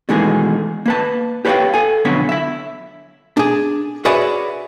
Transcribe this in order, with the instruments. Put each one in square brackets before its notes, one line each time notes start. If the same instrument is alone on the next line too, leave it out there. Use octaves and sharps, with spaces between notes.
[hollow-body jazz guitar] B2 D#3 E3 G#3 A3 G#4
A#3 B4 A5
G4 B4 C#5 D5 F5 G5
A4 G#5
B1 F2 D3 B3 C#5 B5
E5 B5
D4 G#4
F#4 G#4 B4 C#5 D5 E5